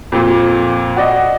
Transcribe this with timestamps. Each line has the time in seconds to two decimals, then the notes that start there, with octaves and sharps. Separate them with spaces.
0.12 F2 A#2
0.96 F#4 D5 D#5